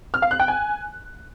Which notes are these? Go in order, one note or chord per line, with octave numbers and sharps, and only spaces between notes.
F6
F5
F#6
G5
G#5